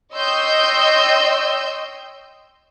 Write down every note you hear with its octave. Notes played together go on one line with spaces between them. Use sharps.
C#5 D#5 G5 C6 E6 G6